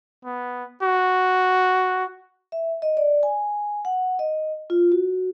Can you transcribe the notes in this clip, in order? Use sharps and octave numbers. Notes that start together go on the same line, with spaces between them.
B3
F#4
E5
D#5
D5
G#5
F#5
D#5
F4
F#4